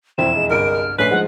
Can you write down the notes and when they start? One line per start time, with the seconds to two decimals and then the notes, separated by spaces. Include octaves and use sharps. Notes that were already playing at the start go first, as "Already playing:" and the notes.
0.18 E1 F2 C4 E4 E7
0.36 G#3
0.50 G1 C2 G2 A#4 D7
0.72 F6
0.98 A#1 A3 C#4 B4 B6 C7
1.11 G#2 F3 G#3 F#5